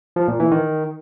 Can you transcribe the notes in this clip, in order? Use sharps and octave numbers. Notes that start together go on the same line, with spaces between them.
F3
A#2
E3
D#3